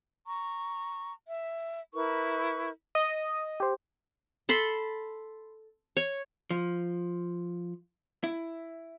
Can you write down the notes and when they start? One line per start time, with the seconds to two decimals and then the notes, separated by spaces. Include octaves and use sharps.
0.27 A#5 C#6
1.27 E5
1.94 E4 A#4 B4 C#6
2.95 D#5 D#6
3.60 G4 C5
4.49 A4 B5 C6
5.97 C#5
6.50 F3
8.24 E4